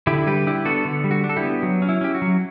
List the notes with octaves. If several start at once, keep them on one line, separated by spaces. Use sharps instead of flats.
D3 E4 G4
G3 G4 B4
D4 E4 G4
B3 F#4 A4
D3
G3
F#4
D4
A4
E4 G4
B3
F#3
C#4
E4
C#4 G4
F#4
F#3